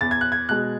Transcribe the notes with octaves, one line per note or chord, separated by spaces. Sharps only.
E2 A6
G#6
F#6
G#6
B2 G#3 F#6